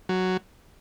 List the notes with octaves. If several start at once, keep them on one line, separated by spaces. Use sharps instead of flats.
F#3